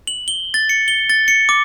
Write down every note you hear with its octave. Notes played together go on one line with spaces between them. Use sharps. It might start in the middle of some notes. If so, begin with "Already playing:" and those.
F#7
G7
A6
C#7
G7
A6
C#7
D6